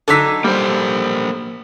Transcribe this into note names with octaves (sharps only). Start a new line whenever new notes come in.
D3 F#3 D#4 A4 E6 B6
G3 A#3 C5